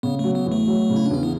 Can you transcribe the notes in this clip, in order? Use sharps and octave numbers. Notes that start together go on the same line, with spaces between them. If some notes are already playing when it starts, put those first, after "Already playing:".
C#3 B3
F#3 A3
B3
E2
A3
F#3
C#3
E4
D4
E2 C#4
B3